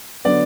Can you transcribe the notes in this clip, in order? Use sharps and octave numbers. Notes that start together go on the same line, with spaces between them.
D3 F#3 B3 D5